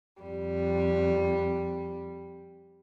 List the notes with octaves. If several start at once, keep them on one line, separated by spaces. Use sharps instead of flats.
F2 G3